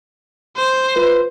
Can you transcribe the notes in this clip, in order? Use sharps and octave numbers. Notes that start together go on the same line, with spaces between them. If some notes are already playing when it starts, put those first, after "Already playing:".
C5
F4 B4